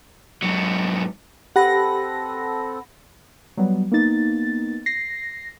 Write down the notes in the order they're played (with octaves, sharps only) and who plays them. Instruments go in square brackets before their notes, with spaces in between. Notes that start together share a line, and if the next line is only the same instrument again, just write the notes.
[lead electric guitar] G#2 F#3
[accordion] C4 A4 [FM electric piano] G4 [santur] B4 [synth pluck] F#5 A#6
[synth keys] F#3 G3 B3
A#3 B3 D#4 A6
A#6 C7